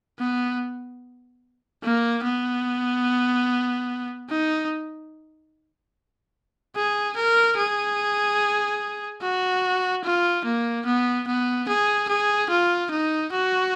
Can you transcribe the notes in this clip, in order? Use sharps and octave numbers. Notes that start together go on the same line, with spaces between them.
B3
A#3
B3
D#4
G#4
A#4
G#4
F#4
F4
A#3
B3
B3
G#4
G#4
F4
D#4
F#4